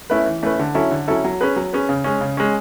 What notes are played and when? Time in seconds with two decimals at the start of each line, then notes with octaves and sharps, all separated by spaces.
0.10 A3 C#4 E4 B4
0.26 E3
0.43 A3 C#4 E4 B4
0.59 D3
0.75 F#3 C#4 E4 A4
0.91 D3
1.08 F#3 C#4 E4 A4
1.24 F#3
1.41 C#4 G#4 B4
1.56 F#3
1.73 C#4 G#4 B4
1.89 C#3
2.04 G#3 C#4
2.21 C#3
2.37 G#3 C#4